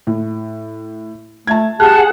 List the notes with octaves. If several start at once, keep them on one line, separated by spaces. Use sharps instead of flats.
A2
A3 A5 G#6
G4 G#4 F#5 A5 F6 F#6